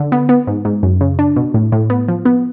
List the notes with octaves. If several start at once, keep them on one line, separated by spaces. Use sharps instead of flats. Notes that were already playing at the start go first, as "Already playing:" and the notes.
Already playing: D3
B3
B3
G#2
G#2
F#2
C#3
D4
B2
A2
A2
B3
F3
B3